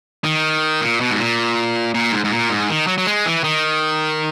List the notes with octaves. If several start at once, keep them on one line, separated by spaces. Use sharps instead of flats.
D#3
A#2
B2
G#2
A#2
A#2
G#2
G#2
A#2
G#2
D#3
F#3
F#3
G#3
E3
D#3